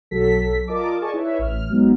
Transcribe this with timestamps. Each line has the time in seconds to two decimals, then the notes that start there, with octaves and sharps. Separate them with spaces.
0.11 B1 F#3 A4 B6
0.67 F4 A#4 D5 D#5 A5 D6
1.01 G#4 D5 D#5 G#5 A5 C#6
1.14 E4 B4 C#5 E5
1.39 A1 F6
1.70 F#3 G#3 B3 D#4